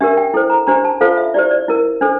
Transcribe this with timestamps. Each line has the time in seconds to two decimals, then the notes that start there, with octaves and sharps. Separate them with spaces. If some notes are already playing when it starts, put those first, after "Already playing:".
0.01 D4 G4 A#4 E5
0.17 G5
0.34 E4 A4 C5
0.50 A#5
0.67 D4 G4 C5 A#5
0.84 A5
1.01 F4 A4 C5 F5
1.17 E5
1.34 E4 G4 C5 D5
1.51 D5
1.68 E4 A#4
2.01 D4 A4 C5